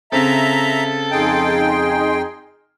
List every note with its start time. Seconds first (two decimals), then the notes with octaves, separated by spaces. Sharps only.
0.12 C#3 C4 A4 E5 A#5
1.11 F2 D#4 G#4 G5 C6